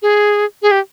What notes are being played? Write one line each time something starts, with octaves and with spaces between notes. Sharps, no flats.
G#4
G#4
G4